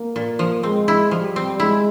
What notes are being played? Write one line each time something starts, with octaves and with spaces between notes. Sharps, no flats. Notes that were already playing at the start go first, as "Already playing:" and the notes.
Already playing: A#3
A#2
F3
G#3 C4
E4
F3 G3
C4
G#3 E4